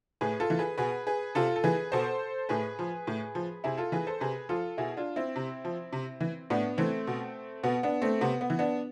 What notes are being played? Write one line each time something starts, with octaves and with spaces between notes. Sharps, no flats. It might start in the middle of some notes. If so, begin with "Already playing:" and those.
A2 G#4 B4
F4 A4
E3
G#4 B4
B2 G#4 B4
G#4 B4
C3 F4 A4
A4
E3 G#4 B4
B2 A4 C5
A2 G#4 B4
F3
A2
F3
C3 E4 G#4
F4 A4
E3 G#4 B4
A4 C5
C3 G#4 B4
F3 F4 A4
B2 E4 G#4
D4 F4
C4 E4
C3
F3
C3
E3
A2 B3 D4
E3 A3 C4
B2
B2 B3
B3 D4
A3 C4
C3 B3
B3
E3
B3 D4